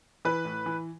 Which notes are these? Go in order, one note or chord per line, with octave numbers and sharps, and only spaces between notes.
E3 B4
A2
E3